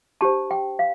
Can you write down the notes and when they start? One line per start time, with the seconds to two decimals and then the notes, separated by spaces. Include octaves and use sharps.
0.21 D4 G4 C5 A5
0.51 G5
0.79 F5